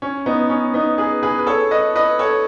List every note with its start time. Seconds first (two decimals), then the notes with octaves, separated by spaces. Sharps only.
0.02 C#4
0.26 B3 D#4
0.49 C#4
0.74 B3 D#4
0.98 G#4 B4
1.23 G#4 B4
1.39 B4
1.47 A4 C#5
1.71 B4 D#5
1.96 B4 D#5
2.19 A4 C#5